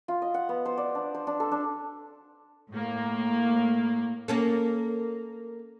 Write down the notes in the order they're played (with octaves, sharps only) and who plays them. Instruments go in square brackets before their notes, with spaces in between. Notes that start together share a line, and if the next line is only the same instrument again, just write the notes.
[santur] F4
D#5
F#5
B3
C5
D5
D4
C5
D4
A4
D4
[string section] A2 A#3
[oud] A#3 C#4 A4